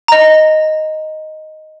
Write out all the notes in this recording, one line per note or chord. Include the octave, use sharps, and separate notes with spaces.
D#5 A#5